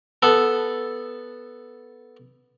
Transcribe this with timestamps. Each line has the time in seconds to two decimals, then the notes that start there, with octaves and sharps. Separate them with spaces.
0.22 B3 A4